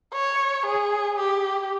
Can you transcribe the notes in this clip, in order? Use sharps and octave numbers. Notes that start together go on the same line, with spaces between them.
C#5
G#4
G4